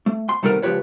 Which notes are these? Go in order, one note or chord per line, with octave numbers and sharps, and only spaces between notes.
A3
C6
C3 D#3 G3 A3 B3 A#4
C#2 F3 F4 G4 B4 C#5